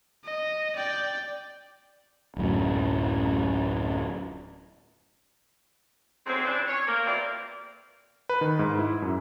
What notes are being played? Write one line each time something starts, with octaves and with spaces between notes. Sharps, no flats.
D#5
D5 G5
D1 F#2 A2
F2 G#2 F#3 C4
C#3 E3 C4 D4
C#5
A#3
F2 B2 E3 C4 D5 F5
B4
D#3
G#2
E4
F#2